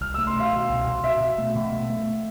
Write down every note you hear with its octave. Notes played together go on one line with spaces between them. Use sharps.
C2 F6
E6
A3
C6
B2 F5
B2
C2
B2
B2 E5
B2
A3
B2
A3
A3